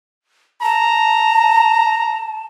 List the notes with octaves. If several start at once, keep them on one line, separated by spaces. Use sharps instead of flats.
A5 A#5